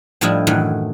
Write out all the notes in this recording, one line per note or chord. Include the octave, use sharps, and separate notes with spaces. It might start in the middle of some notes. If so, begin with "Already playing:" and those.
A2 F3 G3 D4 E4 D#5
F#2 A2 D#3 E3 F#3